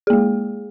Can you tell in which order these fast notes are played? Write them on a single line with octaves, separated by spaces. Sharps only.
G#4 A#3 G#3